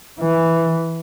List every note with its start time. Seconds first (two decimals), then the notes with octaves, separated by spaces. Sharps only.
0.20 E3